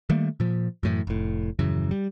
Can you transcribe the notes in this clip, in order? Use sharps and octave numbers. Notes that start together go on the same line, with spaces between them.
D#3 G3 A3 A#3
A#2 F3
F#2 A2 E3
F1 A2
D#1 F#2 C#3 E3
G3